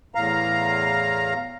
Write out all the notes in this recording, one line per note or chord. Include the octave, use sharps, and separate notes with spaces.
E2 A2 F5 A#5